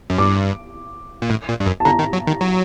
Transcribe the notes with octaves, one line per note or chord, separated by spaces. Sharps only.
F#2
G2 D6
A#2
A2
A#2
G2
F#2
A5
D3 A#5
D#3
F#3
D#3
F#3